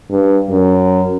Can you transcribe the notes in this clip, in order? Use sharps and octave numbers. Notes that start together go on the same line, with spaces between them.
G2
F#2